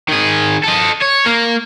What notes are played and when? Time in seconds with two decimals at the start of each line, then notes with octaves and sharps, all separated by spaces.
0.08 D#3 G#4
0.64 A4 D#5
1.02 C#5
1.26 A#3